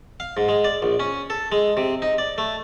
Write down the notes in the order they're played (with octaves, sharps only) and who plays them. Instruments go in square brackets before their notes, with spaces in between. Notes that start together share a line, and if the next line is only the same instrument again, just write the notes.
[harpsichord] F5
G#2
G#3
D5
A#1
C#4
A4
G#3
C3
D#4
D5
A3